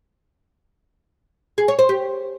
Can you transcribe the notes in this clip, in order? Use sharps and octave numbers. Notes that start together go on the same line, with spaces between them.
G#4
C#5
C5
G4